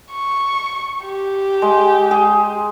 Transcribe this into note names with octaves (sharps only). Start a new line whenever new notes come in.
C#6
G4
G#3
G#4